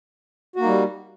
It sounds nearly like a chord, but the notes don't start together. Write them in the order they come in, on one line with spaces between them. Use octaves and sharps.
F#4 A#3 D#4 G3